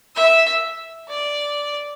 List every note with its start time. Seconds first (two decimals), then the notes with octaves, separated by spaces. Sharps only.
0.16 E5
1.09 D5